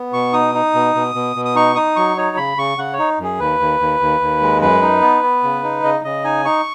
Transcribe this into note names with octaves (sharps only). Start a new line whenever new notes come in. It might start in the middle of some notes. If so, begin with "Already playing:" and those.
Already playing: B3
B2 C#6
D#4 D#6
D#4
B2
B2
B2
B2
D#6
D#4 C#6
D#4 D#6
F#3 C#6
D#4 C#5
C#3 B5
C#3 C#6
C#3 F#5
C#5
D#4
F#2 G#4
D#2 B4
D#2
D#2
D#2
D#2
G#3
F#2 B4
D#4
B3
B3
C#3
D#4
C#3 D#5
C#3 D#5
D#4 G#5
D#4 C#6